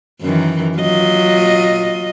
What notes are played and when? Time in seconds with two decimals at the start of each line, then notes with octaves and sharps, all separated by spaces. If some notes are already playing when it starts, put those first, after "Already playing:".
0.22 F#2 D#3 E3
0.78 F#3 F4 D#5